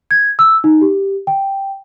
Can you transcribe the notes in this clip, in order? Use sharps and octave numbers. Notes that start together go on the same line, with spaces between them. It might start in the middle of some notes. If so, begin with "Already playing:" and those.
G#6
E6
D#4
G4
G5